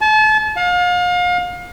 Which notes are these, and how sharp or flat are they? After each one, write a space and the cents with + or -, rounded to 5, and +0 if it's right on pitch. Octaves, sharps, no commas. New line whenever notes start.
A5 -35
F5 +35